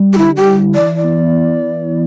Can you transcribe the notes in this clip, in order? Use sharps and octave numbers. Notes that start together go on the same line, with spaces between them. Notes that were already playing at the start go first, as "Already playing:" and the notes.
Already playing: G3
G4
D3 E4
G4
E4
E3 D5
D5
B3